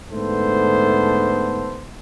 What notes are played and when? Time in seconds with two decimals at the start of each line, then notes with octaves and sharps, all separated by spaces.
0.12 G#2 D3 A3 B3 A4 C5